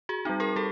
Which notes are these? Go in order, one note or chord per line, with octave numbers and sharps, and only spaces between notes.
F#4 G#4
G3 C4 D#4
G#4 A#4
G3 G4 A4